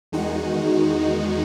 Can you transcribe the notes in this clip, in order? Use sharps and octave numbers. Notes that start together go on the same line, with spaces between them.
E2 D#3 G#3 D#4 F#4